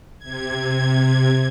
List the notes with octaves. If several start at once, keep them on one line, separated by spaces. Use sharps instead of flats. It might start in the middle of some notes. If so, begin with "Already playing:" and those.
C3 G#6